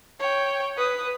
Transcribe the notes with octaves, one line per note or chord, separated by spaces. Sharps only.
C#5 G5
B4 D#6